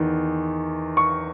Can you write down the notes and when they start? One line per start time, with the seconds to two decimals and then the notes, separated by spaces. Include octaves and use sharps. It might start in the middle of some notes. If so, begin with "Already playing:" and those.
Already playing: E2 D#3
0.97 C#6